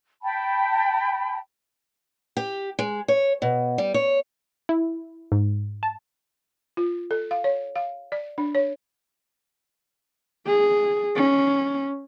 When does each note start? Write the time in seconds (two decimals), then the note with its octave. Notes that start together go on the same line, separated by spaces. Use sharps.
0.23 G5 A5 B5
2.37 G4
2.79 G#3
3.08 C#5
3.42 B2
3.78 G3
3.94 C#5
4.69 E4
5.32 G#2
5.83 A5
6.77 F4
7.11 A4
7.31 F5
7.44 C#5
7.76 F5
8.12 D5
8.38 D4
8.55 C#5
10.47 G#4
11.16 C#4